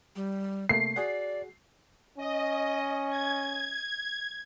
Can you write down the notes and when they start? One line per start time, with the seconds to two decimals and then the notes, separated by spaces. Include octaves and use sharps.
0.16 G3
0.69 C3 A3 A#3 C7
0.96 F#4 G#4 D5 F#5
2.17 C#4 D#5
3.10 G#6